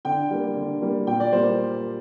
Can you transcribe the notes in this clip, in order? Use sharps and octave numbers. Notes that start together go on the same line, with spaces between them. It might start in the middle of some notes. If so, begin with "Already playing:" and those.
D3 G5
G3 A#3
D3
G3 A#3
A#2 G5
D5
G3 A#3 C5